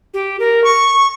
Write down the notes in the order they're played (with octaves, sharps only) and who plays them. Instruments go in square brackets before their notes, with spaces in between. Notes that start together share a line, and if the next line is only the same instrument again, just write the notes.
[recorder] G4
A#4
C#6